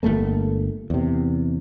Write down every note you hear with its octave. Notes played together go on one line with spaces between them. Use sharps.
G1 D#2 A3 A#3
E2 C3